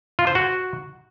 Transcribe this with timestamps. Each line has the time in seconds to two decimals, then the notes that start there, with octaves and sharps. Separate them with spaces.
0.19 F4
0.27 C5
0.35 F#4